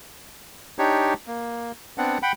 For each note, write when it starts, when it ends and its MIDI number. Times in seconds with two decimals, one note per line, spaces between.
0.79 1.14 62
0.79 1.14 63
0.79 1.14 67
0.79 1.14 73
1.27 1.72 58
1.98 2.18 59
1.98 2.18 60
1.98 2.18 62
1.98 2.18 78
2.23 2.32 78
2.23 2.32 79
2.23 2.32 83